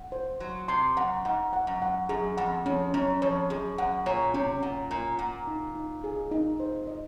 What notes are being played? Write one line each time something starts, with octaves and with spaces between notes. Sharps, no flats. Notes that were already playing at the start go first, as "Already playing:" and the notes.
Already playing: F#5
C5
F#3 C6
C3 C6
F#2 F#5
G#2 F#5
F#5
F#2
F#5
F#2 G#4
F2 F#5
F2 C#4
F#2 C#4
F2 C#5
F#2 G#4
F#2 F#5
A#2 C#5
C3 C#4
A#2 F#5
A#2 C#5
A#2 F#5
D#4
D#4
G#4
D#4
C5
D#5